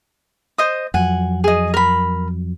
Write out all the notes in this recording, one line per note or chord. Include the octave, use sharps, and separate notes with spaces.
C5 D#5 D#6
F2 F#3 F#5 G#5
G#4 D#5
A#4 B5